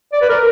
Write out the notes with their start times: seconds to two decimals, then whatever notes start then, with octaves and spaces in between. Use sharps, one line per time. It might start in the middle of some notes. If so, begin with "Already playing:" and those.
0.12 D5
0.21 B4
0.29 A#4